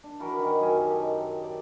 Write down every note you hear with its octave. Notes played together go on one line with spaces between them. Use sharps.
D4
E3 F#4 A#4 B5
D#3 C#4
F#2 G4 G#5
D#4 A4
D5